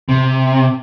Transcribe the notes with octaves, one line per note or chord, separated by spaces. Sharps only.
C3